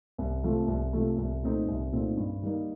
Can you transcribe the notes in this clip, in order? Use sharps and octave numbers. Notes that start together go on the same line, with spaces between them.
C2
C3 F3 A3
C2
C3 F3 A3
C2
A#2 A3 C4 D#4
C2
A#2 A3 C4 D#4
G2
D#3 G3 A#3 D#4